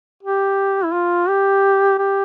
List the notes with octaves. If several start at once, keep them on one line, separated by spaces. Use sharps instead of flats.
G4
E4
F4
G4
G4